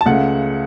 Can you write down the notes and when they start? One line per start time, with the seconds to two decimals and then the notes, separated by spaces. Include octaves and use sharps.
0.01 A5
0.06 C#2 C#3 A3 F#5